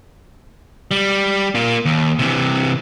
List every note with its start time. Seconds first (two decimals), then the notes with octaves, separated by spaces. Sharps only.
0.91 G3
1.55 A#3 F4
1.85 D#2
2.19 C3 E3